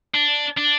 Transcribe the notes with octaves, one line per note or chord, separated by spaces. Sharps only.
D4
D4